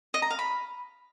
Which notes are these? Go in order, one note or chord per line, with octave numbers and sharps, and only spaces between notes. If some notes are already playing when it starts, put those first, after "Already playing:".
D#5
A#5
F5
B5